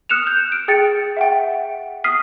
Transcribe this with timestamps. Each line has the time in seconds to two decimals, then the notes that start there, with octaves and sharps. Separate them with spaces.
0.09 D#6 F6 F#6 C#7 E7 F7
0.27 G6
0.52 D7
0.68 G#4 G5 A6 C#7
1.17 E5 F#5 G5
2.04 D#6 F6 B6 C7 D#7